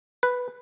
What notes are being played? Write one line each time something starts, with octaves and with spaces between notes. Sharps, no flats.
B4